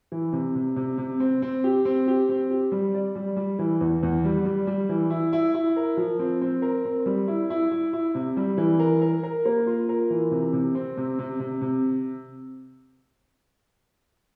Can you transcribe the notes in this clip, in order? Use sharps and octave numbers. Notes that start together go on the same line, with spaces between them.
E3
C3
C3
C3
C3
C4
C4
G4
C4
G4
C4
G4
G3
D5
G3
G3
E3
E2
E2
G3
G3
G3
E3
E4
E4
E4
A#4
F3
C4
C4
A#4
C4
G3
E4
E4
E4
E4
C3
G3
E3
A#4
A#4
A#4
A#3
F4
A#4
E3
C3
C3
C4
C3
C3
C3
C3